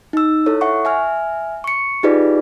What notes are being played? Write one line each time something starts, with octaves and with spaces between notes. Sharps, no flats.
D#4 E6
E4 A4 C#5
E5 F#5 C#6
E5 G#5 F6
C#6 C#7
D#4 F4 G4 G#4 B4 D5